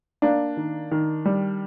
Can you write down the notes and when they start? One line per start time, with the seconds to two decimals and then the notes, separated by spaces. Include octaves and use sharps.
0.22 A#3 D4
0.57 D#3
0.91 D#3
1.25 G3